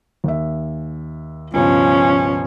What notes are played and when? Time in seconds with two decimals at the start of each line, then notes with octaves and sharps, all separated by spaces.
0.24 D#2 E5
1.54 C#2 G2 B2 F3 C#4